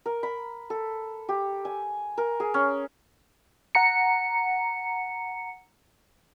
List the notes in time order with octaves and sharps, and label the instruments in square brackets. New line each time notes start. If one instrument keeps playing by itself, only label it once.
[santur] A#4
B5
A4
G4
G#5
A#4
G#4
C#4
[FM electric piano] F#5 A#5 C#7